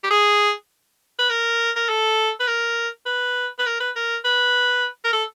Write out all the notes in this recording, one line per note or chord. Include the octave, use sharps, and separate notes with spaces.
G4
G#4
B4
A#4
A#4
A4
B4
A#4
B4
B4
A#4
B4
A#4
B4
A#4
A4